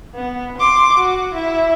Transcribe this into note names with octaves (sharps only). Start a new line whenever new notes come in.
B3
C6 D6
F#4
E4 E5